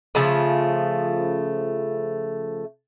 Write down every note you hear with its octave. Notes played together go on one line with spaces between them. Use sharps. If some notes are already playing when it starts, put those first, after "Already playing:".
C#3 F3 A3